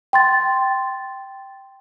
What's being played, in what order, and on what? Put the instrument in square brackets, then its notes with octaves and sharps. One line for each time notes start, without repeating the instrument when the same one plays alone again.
[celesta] G5 C6 A6